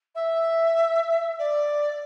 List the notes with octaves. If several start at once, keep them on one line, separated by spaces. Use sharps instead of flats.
E5
D5